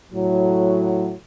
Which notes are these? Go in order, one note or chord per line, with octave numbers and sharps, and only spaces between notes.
A2 F#3